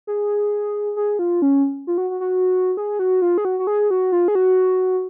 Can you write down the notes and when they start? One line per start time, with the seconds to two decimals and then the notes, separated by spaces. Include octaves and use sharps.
0.07 G#4
0.96 G#4
1.19 F4
1.42 C#4
1.87 F4
1.98 F#4
2.10 F#4
2.20 F#4
2.77 G#4
2.99 F#4
3.22 F4
3.38 G#4
3.45 F#4
3.59 F#4
3.67 G#4
3.90 F#4
4.12 F4
4.28 G#4
4.35 F#4